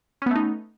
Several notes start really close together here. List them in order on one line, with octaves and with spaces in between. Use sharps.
C#4 B3 A3 D#4